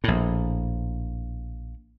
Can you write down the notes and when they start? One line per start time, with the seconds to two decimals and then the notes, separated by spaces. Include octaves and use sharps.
0.04 A#1 A2